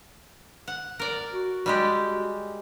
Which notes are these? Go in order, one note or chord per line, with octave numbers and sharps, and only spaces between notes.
F#5
A#4 D5
F#4
G3 G#3 G4